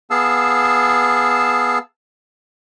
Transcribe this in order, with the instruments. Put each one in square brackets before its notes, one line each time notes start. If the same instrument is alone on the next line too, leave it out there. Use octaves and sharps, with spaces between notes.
[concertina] B3 G#4 F5 A5 E6